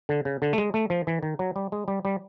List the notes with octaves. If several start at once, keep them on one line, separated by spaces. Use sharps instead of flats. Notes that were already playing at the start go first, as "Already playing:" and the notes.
D3
C#3
D3
A3
G#3
A3
F3
E3
D#3
F#3
G3
G#3
G3
G3